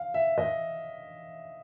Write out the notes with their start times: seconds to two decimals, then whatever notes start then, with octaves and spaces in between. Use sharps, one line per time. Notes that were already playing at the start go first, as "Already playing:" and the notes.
Already playing: F5
0.14 E5
0.38 D#5